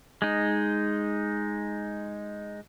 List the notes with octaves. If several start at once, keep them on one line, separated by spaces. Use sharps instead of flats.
G#3 D#4